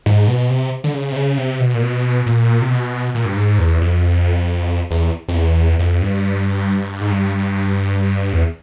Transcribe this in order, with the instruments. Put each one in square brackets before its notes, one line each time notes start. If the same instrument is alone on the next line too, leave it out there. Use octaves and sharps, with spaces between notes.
[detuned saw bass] G#2
B2
C3
D3
C#3
C3
C#3
C3
B2
A#2
B2
A#2
C3
B2
A#2
G2
G#2
E2
F2
E2
F2
E2
F2
G2
G#2
G2
E2